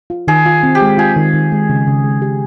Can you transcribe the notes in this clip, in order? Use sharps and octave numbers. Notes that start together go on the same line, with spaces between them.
F4
D#3 G#4
F4
C4
G4
G#3
F4 G#4
D#3
D#3
G#3
C#3
C#3
G#3
G4